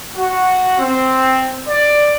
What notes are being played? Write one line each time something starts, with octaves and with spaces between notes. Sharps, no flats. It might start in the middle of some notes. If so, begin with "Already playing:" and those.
F#4
C4
D5